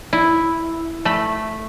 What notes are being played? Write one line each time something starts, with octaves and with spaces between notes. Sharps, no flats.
E4
A3 B5